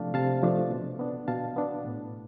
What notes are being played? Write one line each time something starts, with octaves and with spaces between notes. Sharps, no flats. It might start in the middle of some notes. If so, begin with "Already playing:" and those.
Already playing: C3 F3 A3 D4 F5 A5
C3 F5 A5
F3 A3 D4
B2
B3 D4
B2 F5 A5
B3 D4
A2